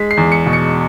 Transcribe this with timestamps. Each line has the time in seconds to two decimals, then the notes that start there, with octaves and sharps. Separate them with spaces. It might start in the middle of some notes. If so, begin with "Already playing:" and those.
Already playing: G#3 B6
0.11 C7
0.17 E2
0.32 C#7
0.46 B2
0.53 C#7